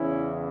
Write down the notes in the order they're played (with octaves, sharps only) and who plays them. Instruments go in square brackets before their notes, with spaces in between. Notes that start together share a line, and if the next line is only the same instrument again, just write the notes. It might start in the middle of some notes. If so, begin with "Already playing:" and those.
Already playing: [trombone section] E2 C#3 E3 C#4 E4